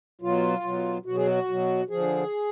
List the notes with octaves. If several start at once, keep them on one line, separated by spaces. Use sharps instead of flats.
B2 F#3 F4
B2 F#3
B2 F#3 F#4
G#4
F#4
B2 F#3
D3 F3 G#4